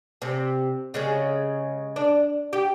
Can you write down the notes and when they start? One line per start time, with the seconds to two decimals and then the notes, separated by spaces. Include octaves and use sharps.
0.22 C3
0.94 C#3 G#3 C#4
1.96 D4
2.53 G4